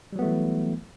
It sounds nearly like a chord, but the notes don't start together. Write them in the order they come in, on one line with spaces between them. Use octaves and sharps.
G3 F#3 B3 A3 E3